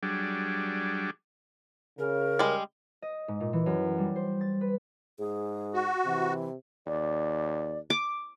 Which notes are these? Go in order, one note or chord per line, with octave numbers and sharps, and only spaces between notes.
F#3 G3 D4 G#4
C#3 A#4
G3 G#3
D#5
G#2
A#2
E3
F#2
G3
C5
A6
B4
G#2 G#4
F#4
C3 E3
D#2 D5
D6